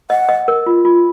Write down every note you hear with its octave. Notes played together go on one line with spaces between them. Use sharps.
D#5 F#5
D#5
A#4
F4
F4